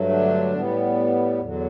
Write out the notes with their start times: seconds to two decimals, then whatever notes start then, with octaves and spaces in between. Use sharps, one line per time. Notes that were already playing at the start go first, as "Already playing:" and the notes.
Already playing: G2 F#3 A3
0.09 D3 D4
0.53 A2 G3 B3
1.40 E2 D3 F#3